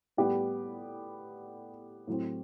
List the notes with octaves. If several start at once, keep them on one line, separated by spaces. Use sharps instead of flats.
A2 G3 B3 G4
A2 F#3 C4